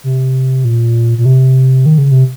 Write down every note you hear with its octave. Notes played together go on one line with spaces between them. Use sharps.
C3
A#2
A#2
C3
D#3
C#3
C3